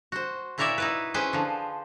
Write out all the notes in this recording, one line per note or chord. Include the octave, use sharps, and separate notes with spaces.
F#4 C5
A#2 E4 A#4 C#5 D5 E5
D#4 E4 B4
C#4 G#4 B4 C5 G5
D3 F3